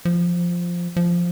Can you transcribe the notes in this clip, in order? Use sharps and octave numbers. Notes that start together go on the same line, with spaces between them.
F3
F3